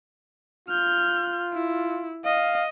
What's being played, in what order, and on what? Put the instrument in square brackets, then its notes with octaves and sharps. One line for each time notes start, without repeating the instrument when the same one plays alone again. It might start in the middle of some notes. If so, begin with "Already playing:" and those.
[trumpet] F4 [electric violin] F6 G6
[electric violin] E4
[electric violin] D#5 [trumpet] F5